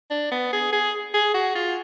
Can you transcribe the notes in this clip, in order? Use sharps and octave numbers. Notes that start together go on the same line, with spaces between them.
D4
B3
G#4
G#4
G#4
F#4
F4